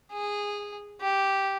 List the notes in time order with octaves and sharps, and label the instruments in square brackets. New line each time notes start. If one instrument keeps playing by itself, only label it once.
[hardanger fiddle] G#4
G4